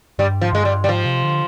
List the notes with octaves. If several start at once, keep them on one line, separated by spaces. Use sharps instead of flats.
G2 G3
G#2 F3
G2 G#3
G3
G3
G#2 F3
C3
D3